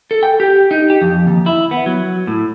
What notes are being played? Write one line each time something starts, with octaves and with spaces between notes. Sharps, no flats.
A4
G5
G4
D#4
G4
F2
D#2
E4
B3
F#3
A2